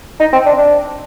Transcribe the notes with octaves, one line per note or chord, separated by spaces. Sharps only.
D#4
C4
D4
D4